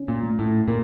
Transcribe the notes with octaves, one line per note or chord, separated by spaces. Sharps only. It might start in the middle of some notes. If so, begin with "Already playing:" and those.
Already playing: C#4
A#2
A3
A2
A#2 A#4